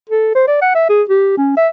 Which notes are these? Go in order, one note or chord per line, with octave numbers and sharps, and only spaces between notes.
A4
C5
D5
F#5
E5
G#4
G4
C#4
E5